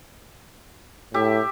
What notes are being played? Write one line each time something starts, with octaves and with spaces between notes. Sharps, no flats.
A2 G4 E5